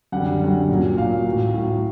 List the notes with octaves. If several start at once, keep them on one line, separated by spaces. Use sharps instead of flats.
F#2 D3 G3 F#5
F#2 D3 G3
A#2 F#3
A#2 F#3 F5
A2 F#3
A2 F#3